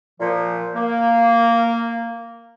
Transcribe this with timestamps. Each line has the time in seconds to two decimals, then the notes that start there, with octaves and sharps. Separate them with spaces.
0.20 A#2 F3
0.75 A#3